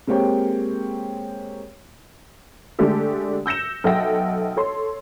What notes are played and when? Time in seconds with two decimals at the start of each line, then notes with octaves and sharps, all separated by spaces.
0.07 G#3 A#3 C4 G4 C#5 G5
2.79 D3 G#3 A3 D4 G4 A4
3.46 E6 G6 A#6 C#7 E7
3.84 B1 A4 E5 F#5 G5 A#6
4.57 A4 C#5 C6